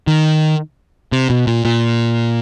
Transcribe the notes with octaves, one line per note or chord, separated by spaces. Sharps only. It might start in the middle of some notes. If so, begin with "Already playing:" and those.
D#3
C3
B2
A#2
A#2